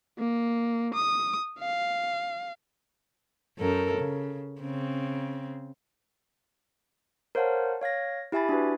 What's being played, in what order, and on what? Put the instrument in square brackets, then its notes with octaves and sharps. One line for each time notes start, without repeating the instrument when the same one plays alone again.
[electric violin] A#3
D#6
F5
[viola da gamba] F#2 A4 A#4
C#3
C#3 C4
[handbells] A#4 C5 C#5 F5 F#5 A5
C#5 F5 G#6 A#6
E4 G4 E5 G#5 B5 A6
D4 E4 F#4 B4